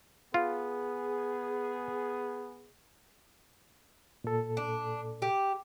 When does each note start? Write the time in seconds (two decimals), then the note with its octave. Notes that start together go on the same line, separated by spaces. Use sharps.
0.34 B3 F4 G#4
4.24 A#2 A4
4.57 D4
5.22 G4